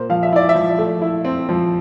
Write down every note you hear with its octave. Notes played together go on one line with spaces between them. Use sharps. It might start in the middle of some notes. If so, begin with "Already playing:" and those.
Already playing: A#2 A#3 C5
F3 F5
E5
E4 D5
E5
F3
A3
E4
C4
F3